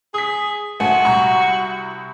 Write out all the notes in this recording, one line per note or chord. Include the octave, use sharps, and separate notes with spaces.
G#4 D#6 B6
G#2 A3 F#4 G#5
C2 A#5 C#6